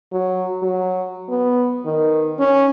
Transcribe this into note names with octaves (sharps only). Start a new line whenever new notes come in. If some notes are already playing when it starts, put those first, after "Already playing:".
F#3
F#3
B3
D#3
C#4